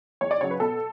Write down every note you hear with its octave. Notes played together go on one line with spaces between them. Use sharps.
E2 C#5
D5
C#3 F#3 C#5
B4
B2 A4